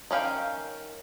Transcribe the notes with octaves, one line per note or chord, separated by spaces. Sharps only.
D#3 C#4 F5 G5